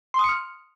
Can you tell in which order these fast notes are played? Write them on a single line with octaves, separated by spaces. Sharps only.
C6 D#6 C#7 F6